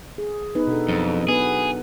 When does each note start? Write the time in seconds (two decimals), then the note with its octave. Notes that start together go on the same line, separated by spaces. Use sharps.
0.18 G#4
0.55 B3 D#4 B4
0.67 B2 D4 A4
0.88 F2 F#3
1.28 B3 D4 G#4 B4